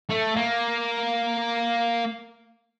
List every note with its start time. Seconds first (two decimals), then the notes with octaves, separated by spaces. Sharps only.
0.10 A3
0.36 A#3